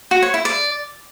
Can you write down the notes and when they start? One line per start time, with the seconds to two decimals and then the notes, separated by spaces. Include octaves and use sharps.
0.11 F#4
0.22 C#5
0.34 E4
0.45 D5